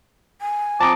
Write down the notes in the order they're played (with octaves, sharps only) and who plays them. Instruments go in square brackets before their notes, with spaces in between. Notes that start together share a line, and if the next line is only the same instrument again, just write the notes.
[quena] G#5
[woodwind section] F3 C4 D6 [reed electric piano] A5 A#5 D#6